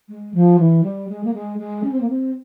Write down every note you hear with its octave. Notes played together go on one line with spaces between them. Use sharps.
G#3
F3
E3
G3
G#3
A#3
G#3
G#3
C#4
C4
A#3
C4